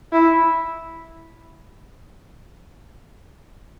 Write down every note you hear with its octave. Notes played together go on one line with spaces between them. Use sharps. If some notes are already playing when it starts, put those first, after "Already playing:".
E4